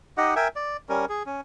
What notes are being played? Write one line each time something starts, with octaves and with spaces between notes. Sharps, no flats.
D#4 G4 D#5 F#5
A#4 E5 G5 G#5
D5
G3 C#4 A#4
G#4
C#4